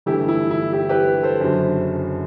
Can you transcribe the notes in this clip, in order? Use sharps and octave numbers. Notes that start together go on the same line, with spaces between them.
G1 G2 E3 A3 E4 G4
E4
E4
E4 G4
G4 B4
A4 C5
F#1 F#2 D3 F#3